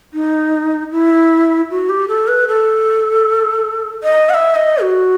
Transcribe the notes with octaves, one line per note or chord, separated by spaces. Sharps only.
D#4
E4
F#4
G4
A4
B4
A4
D#5
F#5
E5
D#5
F#4